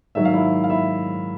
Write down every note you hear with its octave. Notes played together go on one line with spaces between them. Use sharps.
G#2 D#3 F#3 E5
F5
E4 E5
F5
E4 E5